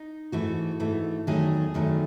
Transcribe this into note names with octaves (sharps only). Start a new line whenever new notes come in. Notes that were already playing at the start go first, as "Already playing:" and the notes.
Already playing: D#4
G#2 E3 A3 F#4
G#2 E3 A3
E2 D#3 F#3 A3 G#4
E2 D#3 F#3 A3